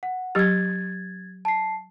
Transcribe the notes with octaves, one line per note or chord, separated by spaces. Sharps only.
F#5
F#3 G4 G#6 A6
A5 C7